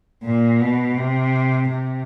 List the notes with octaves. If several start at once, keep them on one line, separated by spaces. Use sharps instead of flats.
A#2
B2
C3
C3